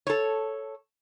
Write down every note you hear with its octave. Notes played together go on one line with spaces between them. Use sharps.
A4 C#5